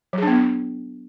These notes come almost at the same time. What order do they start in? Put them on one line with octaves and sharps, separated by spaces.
F#3 G#4 D4 B3